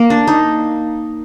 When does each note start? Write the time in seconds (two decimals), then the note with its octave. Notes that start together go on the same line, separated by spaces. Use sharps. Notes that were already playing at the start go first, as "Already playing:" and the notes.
Already playing: A#3
0.10 D4
0.27 D#4